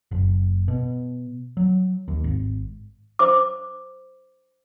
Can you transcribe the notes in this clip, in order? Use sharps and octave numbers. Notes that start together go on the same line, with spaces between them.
F#1
B2
F#3
D#2
G#1
C5 D6